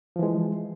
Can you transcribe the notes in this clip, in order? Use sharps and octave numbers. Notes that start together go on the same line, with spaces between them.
E3 F3 G#3